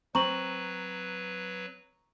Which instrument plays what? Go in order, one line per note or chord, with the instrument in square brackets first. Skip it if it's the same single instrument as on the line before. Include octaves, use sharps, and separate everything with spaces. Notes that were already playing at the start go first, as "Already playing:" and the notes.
[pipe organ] F#3 B4 [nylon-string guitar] C4 [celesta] A#5 C#6 F#7